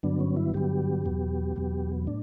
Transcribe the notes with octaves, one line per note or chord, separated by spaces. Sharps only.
G2 D3 F#3 B3 D4
C#4
E4
G2 D3 F#3 B3 G4
E2 B2 F#3 B3
E2 B2 F#3 B3
A2 D4